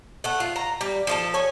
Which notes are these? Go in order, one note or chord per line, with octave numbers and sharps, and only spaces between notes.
A3 F#5
F4
A#5
G3
F3 A3 A4
C#5 G#5